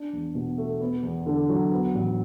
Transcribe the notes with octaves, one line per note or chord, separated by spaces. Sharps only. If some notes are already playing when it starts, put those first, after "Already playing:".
Already playing: D4
E2
B2
A3
B3
E2
D3
F#3
B3
A1